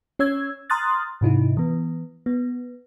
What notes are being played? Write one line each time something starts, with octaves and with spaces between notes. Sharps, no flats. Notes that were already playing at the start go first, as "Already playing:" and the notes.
C#4 C#5 E6 G#6
A#5 C6 D#6 F6 F#6 A6
G#2 C3 D#4 E4
E3 B3
B3